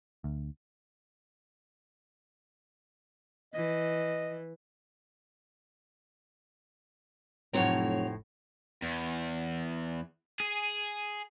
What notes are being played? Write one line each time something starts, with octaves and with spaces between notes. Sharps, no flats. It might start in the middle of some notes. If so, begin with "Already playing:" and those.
D2
E3 D#5
F1 A2 F#3 C4 C#5 A#5
E2
G#4